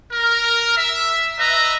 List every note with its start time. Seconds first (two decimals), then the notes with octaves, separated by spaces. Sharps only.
0.12 A#4
0.77 E5
1.38 B4 D#5 E5 A#5